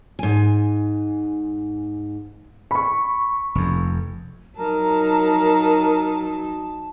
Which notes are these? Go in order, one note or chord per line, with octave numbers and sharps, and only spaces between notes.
G#2 G#5
B5 C#6
F1 F2
F#3 D#4 A#4 A5 A#5